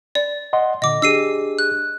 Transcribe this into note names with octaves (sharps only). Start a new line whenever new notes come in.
D5
D#5 F#5 C6
A#2 D3 D#5 D6
D4 G4 G#4 E6 C7 D#7
F#6